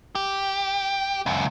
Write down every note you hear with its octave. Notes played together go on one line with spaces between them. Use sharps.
G4
C#2 F#2